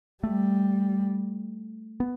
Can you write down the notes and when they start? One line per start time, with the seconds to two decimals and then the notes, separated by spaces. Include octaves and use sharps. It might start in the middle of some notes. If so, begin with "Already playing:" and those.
0.23 G3 A3
2.00 B3